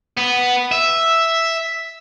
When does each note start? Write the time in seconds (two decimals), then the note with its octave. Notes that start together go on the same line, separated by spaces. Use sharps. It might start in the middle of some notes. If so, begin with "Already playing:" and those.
0.17 B3
0.72 E5